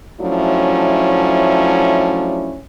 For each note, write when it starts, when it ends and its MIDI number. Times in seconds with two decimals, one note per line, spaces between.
0.20 2.57 53
0.20 2.57 54
0.20 2.57 57
0.20 2.57 61
0.20 2.57 62
0.20 2.57 64